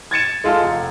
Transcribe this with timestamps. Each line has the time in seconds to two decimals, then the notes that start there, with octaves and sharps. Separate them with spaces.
0.11 G#6 A6 C#7 E7
0.44 G#3 F4 A4
0.63 F1